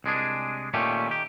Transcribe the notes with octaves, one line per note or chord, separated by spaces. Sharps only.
C2 G#3 D4 G#4
A#2 D#3 A3 C#4 G4
D#3 G4